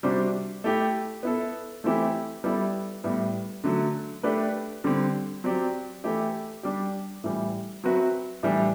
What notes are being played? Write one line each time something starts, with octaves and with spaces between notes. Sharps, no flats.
C3 G3 D4 F#4 C5
A3 E4 G4
B3 E4 A4
E3 A3 C4 E4 G4
G3 B3 E4 A4 D5
A2 G3 B3
D3 F#3 A3
A3 D4 G4 B4 D5
D3 G3 C4
F#3 C4 G4 D5
E3 A3 E4 G4
G3 D4 G4
A2 E3 G3
F#3 C4 F#4 B4 E5
A2 E3 G3 D4